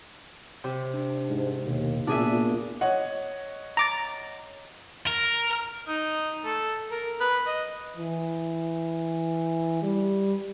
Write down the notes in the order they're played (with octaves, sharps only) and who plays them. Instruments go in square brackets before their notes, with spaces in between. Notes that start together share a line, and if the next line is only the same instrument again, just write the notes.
[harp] C3
[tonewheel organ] D4
[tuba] G#2
[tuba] D#2 [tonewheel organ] B2
[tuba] A#2 [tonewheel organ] B3 F4 [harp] D4 G#4 E5
[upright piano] C#5 D#5 F#5
[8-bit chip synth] A#5 D6 A6
[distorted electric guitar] A#4
[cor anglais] D#4
A4
A#4
B4
D#5
[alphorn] E3
G3